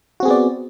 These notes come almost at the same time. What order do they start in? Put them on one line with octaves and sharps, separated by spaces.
F#4 C4 G#4 B3 D5